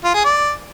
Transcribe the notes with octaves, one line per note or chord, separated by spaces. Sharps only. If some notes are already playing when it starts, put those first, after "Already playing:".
F4
G#4
D5